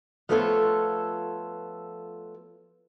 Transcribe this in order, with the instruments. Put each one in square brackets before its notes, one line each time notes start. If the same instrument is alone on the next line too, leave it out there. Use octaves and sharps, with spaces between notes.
[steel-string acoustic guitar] F3 A3 B3 F4 A4 C#5